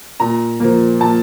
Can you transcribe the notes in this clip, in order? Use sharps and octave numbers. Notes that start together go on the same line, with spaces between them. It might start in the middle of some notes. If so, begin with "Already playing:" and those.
A#2 A#5
F3 A#3
A#2 A5